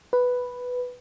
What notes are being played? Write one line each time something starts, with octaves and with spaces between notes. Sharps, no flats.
B4